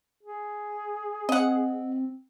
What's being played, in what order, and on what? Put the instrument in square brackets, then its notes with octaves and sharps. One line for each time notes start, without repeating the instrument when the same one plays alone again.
[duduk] G#4
[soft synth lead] C4 [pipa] D#5 F#5